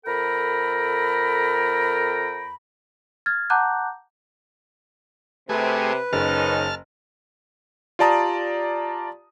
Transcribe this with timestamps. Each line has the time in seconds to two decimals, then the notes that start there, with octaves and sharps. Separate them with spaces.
0.06 F2 A4 A#4 G5 A#5 B5
3.26 F6 G#6 A6
3.50 F#5 A5 A#5 D6 F#6 G6
5.49 C3 A3 G#4 B4
6.13 F#1 D#3 C#4 D#4 A5 F6
7.99 F4 G4 D5 A5 A#5 D#6